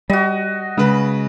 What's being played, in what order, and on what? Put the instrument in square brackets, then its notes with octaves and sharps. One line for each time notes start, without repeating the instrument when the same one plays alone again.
[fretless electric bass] G3 [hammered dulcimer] F#4 D#5
[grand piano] C#3 B4 [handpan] G#3